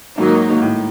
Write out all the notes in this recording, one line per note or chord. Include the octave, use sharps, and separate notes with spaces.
G#2 D#3 F#3 A#3 D#4
A2